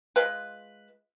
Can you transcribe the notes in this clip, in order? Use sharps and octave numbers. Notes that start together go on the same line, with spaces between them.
G#3 F4 B4